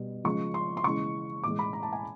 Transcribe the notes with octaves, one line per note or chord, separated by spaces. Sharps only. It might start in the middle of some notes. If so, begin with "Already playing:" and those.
Already playing: B2 G3
C#3 F3 G#3 C#6
C6
C6
C#3 E3 G#3 C#6
A2 E3 G#3 D6
B5
A#5
A5
G#5